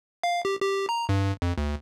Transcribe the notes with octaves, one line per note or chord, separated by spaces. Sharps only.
F5
G4
G4
A#5
G2
F2
D2